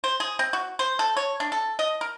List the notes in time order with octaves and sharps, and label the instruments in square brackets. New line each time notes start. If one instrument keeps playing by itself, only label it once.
[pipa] C5
G#4
C4
F#4
C5
A4
C#5
D4
A4
D#5
A#4